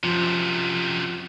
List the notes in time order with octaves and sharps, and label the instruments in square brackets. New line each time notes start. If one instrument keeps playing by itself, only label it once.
[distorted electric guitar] F#2 C3 [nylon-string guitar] F3